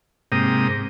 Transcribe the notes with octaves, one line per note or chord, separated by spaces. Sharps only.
G#2 C3 A#3 G5 A#5 D#6